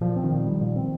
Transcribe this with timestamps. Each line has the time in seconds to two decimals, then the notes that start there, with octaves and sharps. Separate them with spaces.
0.01 A#2 F3
0.16 C4
0.24 D#3
0.31 A#2
0.46 G3
0.61 A#2
0.76 C4